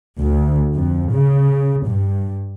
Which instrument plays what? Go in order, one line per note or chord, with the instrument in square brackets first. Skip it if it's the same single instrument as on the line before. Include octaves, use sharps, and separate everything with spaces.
[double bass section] D2
F2
C#3
G2